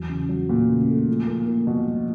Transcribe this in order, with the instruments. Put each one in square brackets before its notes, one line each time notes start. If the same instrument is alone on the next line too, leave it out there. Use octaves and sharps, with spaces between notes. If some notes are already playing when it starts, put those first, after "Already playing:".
Already playing: [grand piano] E2 F#3
C#3
F#3
[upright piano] A#2 [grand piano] A3
[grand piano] C#3
A3
F3
A#3
A#3
[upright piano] B2 [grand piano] F3
[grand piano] F3